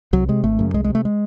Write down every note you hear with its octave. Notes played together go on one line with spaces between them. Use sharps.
C2 F#3
C3 G#3
G#1 A3
F#2 C#3
C2 G#3
G#3
C3 A3
G#3